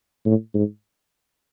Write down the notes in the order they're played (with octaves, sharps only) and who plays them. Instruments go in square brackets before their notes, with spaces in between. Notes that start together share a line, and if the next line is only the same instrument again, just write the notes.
[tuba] A2
G#2